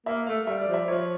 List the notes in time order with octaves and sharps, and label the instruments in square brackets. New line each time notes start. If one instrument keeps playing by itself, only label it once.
[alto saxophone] A#3 [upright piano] E5
[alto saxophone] A3 [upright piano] F5
[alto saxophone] G3 [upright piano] E5
[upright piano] D5
[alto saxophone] F3
[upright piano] E5
[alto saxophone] F3 [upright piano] C#5